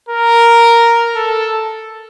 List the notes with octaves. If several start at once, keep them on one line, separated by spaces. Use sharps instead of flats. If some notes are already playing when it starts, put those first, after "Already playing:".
A#4
A4